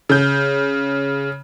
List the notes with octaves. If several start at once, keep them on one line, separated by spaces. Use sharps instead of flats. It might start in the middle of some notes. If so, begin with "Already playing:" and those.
C#3 G6